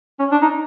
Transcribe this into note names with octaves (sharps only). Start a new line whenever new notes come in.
C#4
D4
D#4